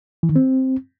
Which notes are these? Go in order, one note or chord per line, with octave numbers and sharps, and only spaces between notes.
E3
D#3
C4